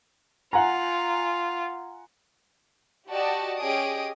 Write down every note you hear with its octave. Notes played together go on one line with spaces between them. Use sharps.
F4 F#5 G#5 A#5
F#4 G4 D5 D#5 A5
C#4 G4 G#4 D#5 D#6 D7